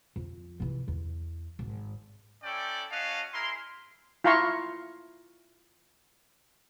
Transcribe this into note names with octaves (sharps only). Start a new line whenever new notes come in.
F2
C3 E3
E2
G#1
C#4 E4 A4 D5 G5
C#4 F#4 D#5 F5 F#5 A5
E4 G#4 A#4 C6
E4 F4 F5 A#5 C6 C#6